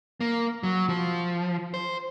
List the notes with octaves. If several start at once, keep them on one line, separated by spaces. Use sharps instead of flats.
A#3
F#3
F3
C5